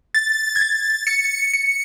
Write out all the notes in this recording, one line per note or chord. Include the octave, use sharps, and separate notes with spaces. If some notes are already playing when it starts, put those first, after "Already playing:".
A6
G#6
A6
C#7
C#7